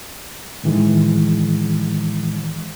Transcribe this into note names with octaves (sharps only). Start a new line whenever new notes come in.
A2 D#3 E3 G#3